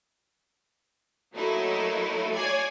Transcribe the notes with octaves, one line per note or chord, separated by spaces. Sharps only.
F#3 A3 A#3 D#4 E4
C#5 D5 G#5 D6 G#6 C7